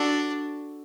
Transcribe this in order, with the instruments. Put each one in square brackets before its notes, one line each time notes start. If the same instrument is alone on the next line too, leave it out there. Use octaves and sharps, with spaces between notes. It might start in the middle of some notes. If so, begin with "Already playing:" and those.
Already playing: [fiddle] D4 [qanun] F#4 A4